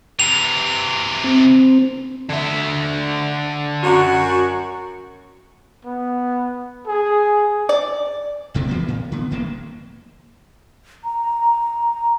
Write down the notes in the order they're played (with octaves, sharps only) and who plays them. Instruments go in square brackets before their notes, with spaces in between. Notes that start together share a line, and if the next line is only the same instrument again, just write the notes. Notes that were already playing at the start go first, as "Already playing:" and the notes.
[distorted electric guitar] C3 E3 [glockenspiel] F7
[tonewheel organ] C4
[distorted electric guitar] D3 E5
[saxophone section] F#2 F#4
[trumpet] B3
G#4
[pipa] D5
[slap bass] G#1 E2 C3 A3
E3 A#3 B3
A2
D3 B3
D1 E2 A2 A#3
[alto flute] A#5